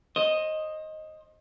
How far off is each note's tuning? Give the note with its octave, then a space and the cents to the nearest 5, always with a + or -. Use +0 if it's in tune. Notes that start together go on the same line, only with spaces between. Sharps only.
C5 +35 D#5 +0